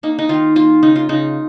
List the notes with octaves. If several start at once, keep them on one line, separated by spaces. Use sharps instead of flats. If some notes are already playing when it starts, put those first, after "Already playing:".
A#3 D#4
D#4
D#3 F4
A#3 F4
C#3 D#4
F4
C#3 D#4